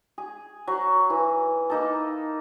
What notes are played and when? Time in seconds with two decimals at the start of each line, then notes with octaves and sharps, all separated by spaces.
0.18 G#4
0.68 F#3
1.10 E3
1.70 A#3 D#4 A4